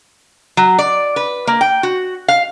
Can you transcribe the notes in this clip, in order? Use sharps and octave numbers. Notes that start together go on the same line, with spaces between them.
F#3
D5
B4
A#3
G5
F#4
F5